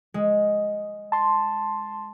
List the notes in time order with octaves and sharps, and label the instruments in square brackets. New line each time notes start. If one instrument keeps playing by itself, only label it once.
[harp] G#3
[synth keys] A5 C6